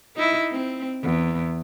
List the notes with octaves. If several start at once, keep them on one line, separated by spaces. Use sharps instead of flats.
D#4 E4
C4
E2